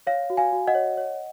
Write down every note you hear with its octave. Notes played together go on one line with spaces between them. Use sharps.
C#5 F5
F#4
F5 G#5
F#4
D#5 F#5
C#5
C#5